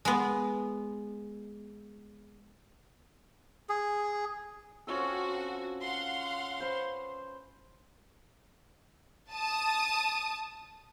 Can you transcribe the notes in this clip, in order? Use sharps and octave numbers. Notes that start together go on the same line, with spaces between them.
G#3 B3
G#4
C4 C#4 F4 F#4 A4
F5 F#5 C6
B4 C5
A5 D#6